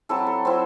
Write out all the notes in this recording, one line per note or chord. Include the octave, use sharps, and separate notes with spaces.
F#3 C4 E4 A4
A4
F#3 C4 E4 C5